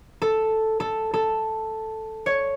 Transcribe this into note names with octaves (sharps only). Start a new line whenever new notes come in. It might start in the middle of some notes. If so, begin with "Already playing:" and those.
A4
A4
A4
C#5